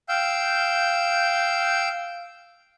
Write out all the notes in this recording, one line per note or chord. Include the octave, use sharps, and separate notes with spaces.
F5 G5 E6 G6